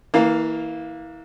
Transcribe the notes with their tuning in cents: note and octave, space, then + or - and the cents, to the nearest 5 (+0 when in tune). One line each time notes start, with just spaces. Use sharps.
E3 -25 A#3 +0 F5 +0